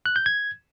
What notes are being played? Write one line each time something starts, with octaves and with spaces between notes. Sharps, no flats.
F#6
G6
G#6